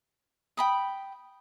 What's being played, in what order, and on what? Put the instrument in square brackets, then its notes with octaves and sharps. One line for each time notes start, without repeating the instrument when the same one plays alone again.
[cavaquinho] G5 B5 D#6